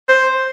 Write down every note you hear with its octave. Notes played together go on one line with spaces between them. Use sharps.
C5